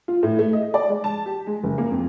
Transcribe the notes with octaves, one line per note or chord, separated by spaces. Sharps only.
F4
A2
A3
D#5
D5
G#3
A5
G4
G#3
F#1
A#3
F2